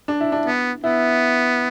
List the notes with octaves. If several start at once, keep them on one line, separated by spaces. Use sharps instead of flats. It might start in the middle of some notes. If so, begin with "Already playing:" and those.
D4
E4
D4
B3
B3 E4